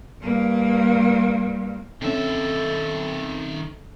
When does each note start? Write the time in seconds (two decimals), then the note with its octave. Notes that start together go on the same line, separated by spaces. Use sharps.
0.22 G2 A#3
2.02 D#3 C4 C#4 A4 E5